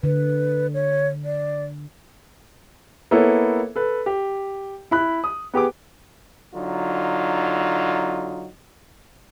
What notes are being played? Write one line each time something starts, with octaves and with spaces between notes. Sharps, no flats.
D3 B4
C#5
D5
A#3 B3 E4 A4 C#5
A4 B4
G4
E4 B5 F#6
D#6
B3 G4 G#4 D6
D3 F#3 D#4 F4